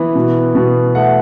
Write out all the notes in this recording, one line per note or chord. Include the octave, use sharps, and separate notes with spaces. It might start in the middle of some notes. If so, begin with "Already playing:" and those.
Already playing: E3 B3
B2
B2
A3 F#5